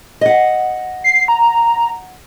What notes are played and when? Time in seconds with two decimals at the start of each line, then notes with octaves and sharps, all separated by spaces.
0.21 D#5 F#5
1.04 C7
1.28 A#5